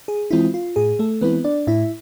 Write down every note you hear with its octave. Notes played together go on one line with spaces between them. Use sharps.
G#4
E3 G#3 C4 E4 F4
F4
A2 G#4
A3 A4
E3 G#3 B3 C4 E4 B4
D4 D5
A2 E4 E5